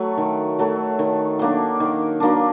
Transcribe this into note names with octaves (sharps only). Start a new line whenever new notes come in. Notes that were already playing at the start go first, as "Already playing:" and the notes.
Already playing: F#3 A3
D#3
F#3 A3
D#3
F#3 A#3 D4
D#3
F#3 A#3 D4